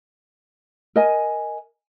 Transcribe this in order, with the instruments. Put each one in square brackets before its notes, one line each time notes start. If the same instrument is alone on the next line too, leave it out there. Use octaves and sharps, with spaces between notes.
[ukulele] A#4 D#5 G#5